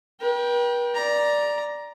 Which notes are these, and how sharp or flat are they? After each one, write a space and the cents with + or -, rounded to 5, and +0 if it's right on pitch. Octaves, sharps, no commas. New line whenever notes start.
B4 -45 G5 +0
D5 +0 A#5 +15